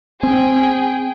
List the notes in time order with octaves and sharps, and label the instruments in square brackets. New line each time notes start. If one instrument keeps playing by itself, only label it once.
[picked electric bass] C4 [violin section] G#4 G5